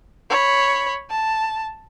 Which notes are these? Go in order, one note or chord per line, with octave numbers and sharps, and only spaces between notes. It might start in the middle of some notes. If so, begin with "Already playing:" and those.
C#5 B5
A5